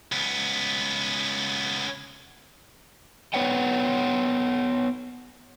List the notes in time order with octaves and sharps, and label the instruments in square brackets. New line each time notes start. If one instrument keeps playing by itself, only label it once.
[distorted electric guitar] C#2 B3
[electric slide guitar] B3 B4 C#5 F#5 G5